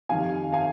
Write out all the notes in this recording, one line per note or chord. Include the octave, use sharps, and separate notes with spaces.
F2 D#3 G3 F5 G#5
F5 G#5